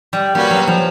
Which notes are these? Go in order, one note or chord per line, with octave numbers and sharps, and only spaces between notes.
G3
G3 A#3 C#4 F#4 B4
F#3
F3